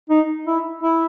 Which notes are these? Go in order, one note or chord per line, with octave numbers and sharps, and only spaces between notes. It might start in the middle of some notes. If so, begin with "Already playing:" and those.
D#4
E4
E4